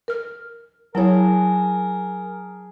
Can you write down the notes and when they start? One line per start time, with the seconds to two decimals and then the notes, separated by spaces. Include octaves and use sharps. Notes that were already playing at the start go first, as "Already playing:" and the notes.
0.08 A#4 F6
0.95 F#3 E4 G#4 A#4 C#5 A5